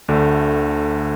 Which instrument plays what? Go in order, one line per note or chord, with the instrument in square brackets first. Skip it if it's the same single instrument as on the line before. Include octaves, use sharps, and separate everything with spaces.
[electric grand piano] D2 D3 A3